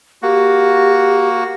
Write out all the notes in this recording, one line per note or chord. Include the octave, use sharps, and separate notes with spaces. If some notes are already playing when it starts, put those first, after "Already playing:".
A#3 F#4 G4